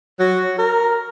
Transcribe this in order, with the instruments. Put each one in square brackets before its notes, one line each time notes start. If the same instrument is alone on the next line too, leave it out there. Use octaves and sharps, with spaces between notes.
[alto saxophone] F#3 [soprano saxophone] F#4
[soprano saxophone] A#4